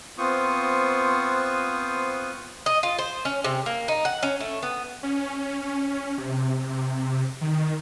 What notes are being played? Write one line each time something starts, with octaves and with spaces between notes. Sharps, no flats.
B3 C4 F4 C5 C#6 D#6
D#5
F4
C5
C#4
C3
A#3
D#4
F#5
C#4
A3
B3
C#4
C3
D#3